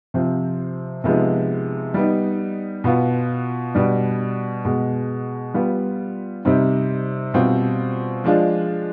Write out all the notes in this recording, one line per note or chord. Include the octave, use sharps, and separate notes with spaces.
C3 F3 C4
C3 F3 G#3 B3 D#4
G3 B3 D#4
B2 B3 F4
B2 G3 D4
B2 G#3 B3
G3 B3 F4
C3 G3 C4 D#4
B2 G3 C4 F4
F3 G#3 D4 F4